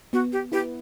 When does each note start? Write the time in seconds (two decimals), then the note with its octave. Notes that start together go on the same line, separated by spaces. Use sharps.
0.13 B3 F#4
0.33 G4
0.52 E4 G4 B4